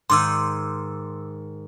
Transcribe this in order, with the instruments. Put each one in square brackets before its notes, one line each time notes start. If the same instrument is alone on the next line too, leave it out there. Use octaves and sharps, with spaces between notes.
[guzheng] G#2 D#3 [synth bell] C6 D6 E6